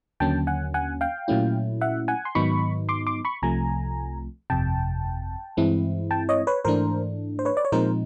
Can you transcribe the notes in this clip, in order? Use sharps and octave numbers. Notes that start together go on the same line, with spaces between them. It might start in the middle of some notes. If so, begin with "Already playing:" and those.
D#2 D3 F#3 A#3 C#4 G5 A5
F#5 G#5
F#5 G#5
F5 G5
A#2 F#3 A3 C#4 E4
E5 F#5
F#5 G#5
C6
G#2 D#3 F#3 B3 D#4 B5 C#6
C6 D6
C6 D6
B5 C#6
C2 C3 F3 A3 G#5 A#5
G1 F2 C3 G5 A5
G2 E3 G#3 C4 E4
G5 A5
C#5 D#5
B4 C#5
G#2 E3 A3 D4 A#4 C5
C5
B4 C#5
D5
C#5
A#2 F3 G#3 C4 D#4 A#4 C5